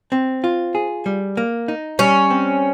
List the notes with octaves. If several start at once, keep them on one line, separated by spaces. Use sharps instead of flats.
C4
F4
G#4
G3
A#3
D#4
G3 C#4
C4